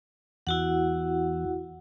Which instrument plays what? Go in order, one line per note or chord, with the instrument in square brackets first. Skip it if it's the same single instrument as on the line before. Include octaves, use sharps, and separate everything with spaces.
[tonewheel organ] E2 [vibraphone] E4 F#4 F#5